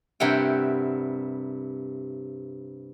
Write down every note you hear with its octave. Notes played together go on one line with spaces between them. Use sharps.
G2 C3 E4 A#4 F#5 G5